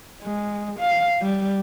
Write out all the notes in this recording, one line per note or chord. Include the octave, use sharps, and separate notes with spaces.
G#3
F5
G3